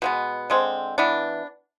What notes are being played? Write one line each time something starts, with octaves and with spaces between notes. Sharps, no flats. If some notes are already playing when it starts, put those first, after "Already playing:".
B2 G#3 B3
D3 G#3 C4
E3 B3 D4